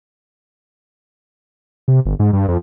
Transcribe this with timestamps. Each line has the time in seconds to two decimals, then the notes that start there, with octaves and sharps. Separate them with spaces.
1.88 C3
2.06 G1
2.19 G#2
2.33 G2
2.48 F2